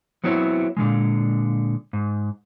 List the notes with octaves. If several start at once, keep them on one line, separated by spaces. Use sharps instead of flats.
F#3 B3 C4 E4 C#5
A#2 D3 D#3 G#3
G#2